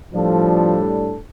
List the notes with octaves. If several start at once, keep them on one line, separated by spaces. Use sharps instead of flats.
A2 F3 G3 D4 A4